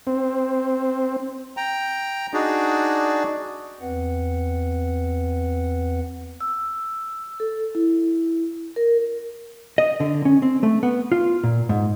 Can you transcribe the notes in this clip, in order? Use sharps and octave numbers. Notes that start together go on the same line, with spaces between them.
C4
G5 A#5
D4 D#4 F#4 G#4 D5
E2 C4 B4 F#5
E6
A4
E4
A#4
D#5
D3
C#4
C4
A3
B3
F4
A#2
G#2